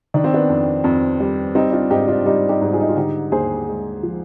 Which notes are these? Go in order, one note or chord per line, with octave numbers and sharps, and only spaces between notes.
D#3 D4
C4
B3 D4
F2
F2
G3
G3 C4 D#4
D4 F4
G#2 D#4 G4
D4 F4
G3 D#4 G4
D#4 G4
G#2
F4 G#4
D#4
F4
D3 D#4 G4
D#2 G#4 C5
G#3
F3